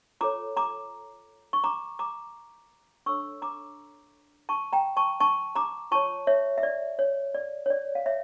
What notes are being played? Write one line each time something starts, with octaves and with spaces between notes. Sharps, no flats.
F4 A4 C#5 A#5 D6
A#5 D6
C#6
A#5 D6
A#5 D6
D4 A4 C#5 C#6 E6
A#5 D6
A5 C#6
G5 A#5
A5 C#6
A5 C#6
A#5 D6
F4 C#5 A5 C#6
C#5 E5
E5
D5
C#5
D5
C#5
D5
F5
C#5 E5